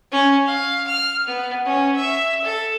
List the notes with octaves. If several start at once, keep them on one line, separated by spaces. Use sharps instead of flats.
C#4
F5
F6
B3
C#4
E5
A4